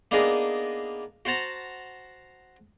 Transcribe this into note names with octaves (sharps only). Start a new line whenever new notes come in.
A#3 B3 D4 D#4 G#4 A#4
F#4 C5 F#5 A5 A#5